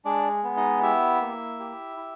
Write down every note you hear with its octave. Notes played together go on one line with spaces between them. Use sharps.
G#3 D4 D5
B3
D#4 D#5
E4 G4 E5
A#3
G4
E4